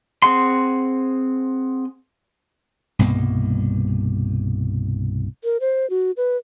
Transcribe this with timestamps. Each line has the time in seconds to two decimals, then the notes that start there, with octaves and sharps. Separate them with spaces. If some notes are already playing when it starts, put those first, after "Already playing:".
0.22 C4 G#4 F#5 C6
2.99 C2 G2 B2 A#3
5.44 A#4
5.61 C5
5.90 F#4
6.17 B4